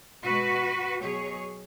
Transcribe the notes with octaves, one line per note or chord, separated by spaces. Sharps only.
B2 G#3 F#4 B4
B2 F#3 G#4 C#5